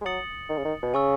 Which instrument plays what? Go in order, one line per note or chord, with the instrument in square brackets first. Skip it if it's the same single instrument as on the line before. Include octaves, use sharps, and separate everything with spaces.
[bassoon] G#3
[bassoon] F#3 [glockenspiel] D#6 A6 C#7 F#7
[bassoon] D#3
C#3
D#3
B2
[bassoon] C#3 [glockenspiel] G#5 C#6 E6